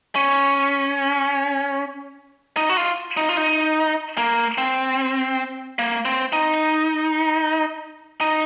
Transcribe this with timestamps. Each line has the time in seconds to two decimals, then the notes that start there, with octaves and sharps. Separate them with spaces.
0.15 C#4
2.57 D#4
2.69 F#4
2.77 F4
3.17 D#4
3.29 F4
3.37 D#4
4.18 A#3
4.58 C4
5.79 A#3
6.05 C4
6.33 D#4
8.20 D#4